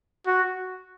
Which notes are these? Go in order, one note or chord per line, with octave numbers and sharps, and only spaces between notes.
F#4